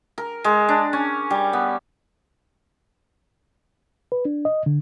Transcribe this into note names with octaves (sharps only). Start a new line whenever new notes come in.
A#4
G#3
D4
C#4
G3
B3
B4
D4
D#5
D3